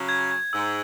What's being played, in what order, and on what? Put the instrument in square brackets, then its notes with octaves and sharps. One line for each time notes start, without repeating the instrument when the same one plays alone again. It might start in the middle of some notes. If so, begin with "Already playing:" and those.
Already playing: [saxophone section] C#3 F#3
[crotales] G#6
G#6
[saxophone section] G#2 [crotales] E6